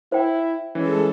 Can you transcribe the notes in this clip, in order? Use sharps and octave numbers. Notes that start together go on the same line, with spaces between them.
E4 C5 G5
E3 G#3 C#4 A4